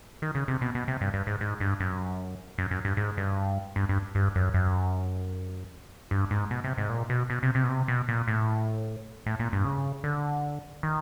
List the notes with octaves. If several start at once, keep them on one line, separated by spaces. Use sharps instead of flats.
D#3
C#3
C3
B2
B2
C3
G2
G2
G#2
G#2
G2
F#2
F#2
F#2
G2
G#2
G2
G2
G2
G2
F#2
F#2
G2
G#2
B2
C3
G#2
A#2
B2
B2
C3
C3
B2
C3
B2
A#2
A2
A2
A#2
G2
C#3
D3
D#3